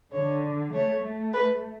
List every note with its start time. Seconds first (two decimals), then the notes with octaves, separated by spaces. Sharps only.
0.12 D3 C#5
0.73 A3 C#5
1.03 A3
1.33 B4